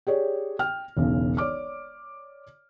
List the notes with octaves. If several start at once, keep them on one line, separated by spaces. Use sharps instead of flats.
G4 G#4 C#5 D5
G5 F6
E1 B1 C#3
C#5 D5 D6 F6